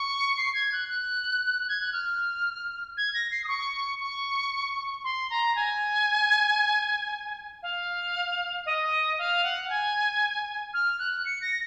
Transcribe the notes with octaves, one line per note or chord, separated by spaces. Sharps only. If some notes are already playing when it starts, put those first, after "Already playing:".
Already playing: C#6
C7
G#6
F#6
F#6
G#6
F#6
F6
G#6
A#6
C7
D#6
C#6
C#6
C6
A#5
G#5
F5
D#5
F5
F#5
F#5
G#5
F6
F#6
C#7
A#6